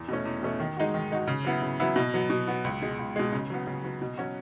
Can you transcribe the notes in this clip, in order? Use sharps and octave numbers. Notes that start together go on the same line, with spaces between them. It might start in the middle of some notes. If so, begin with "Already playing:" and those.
Already playing: E2
B2 A3 C#4
E2
B2 A3 C#4
D#3
G#3 D#4 F#4
D#3
G#3 D#4 F#4
C#3
F#3 B3 E4
C#3
F#3 B3 E4
B2
F#3 B3
B2
F#3 B3
C#2
B2 G#3
C#2
B2 G#3
C#3
F#3 B3
C#3
F#3 B3
B2
F#3 C#4 F#4